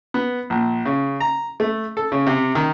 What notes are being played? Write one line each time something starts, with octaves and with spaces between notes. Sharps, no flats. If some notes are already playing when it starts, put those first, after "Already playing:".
B3
A#1
C#3
A#5
A3
A4
C#3
C3
D#3